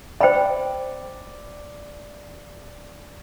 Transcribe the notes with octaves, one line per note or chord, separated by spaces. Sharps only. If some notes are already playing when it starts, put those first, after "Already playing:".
C5 D5 G5 B5